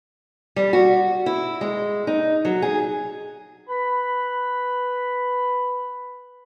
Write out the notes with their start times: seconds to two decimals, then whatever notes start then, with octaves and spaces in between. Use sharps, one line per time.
0.56 G3
0.73 F#4
1.26 E4
1.61 G#3
2.07 D#4
2.45 F#3
2.62 G#4
3.68 B4 B5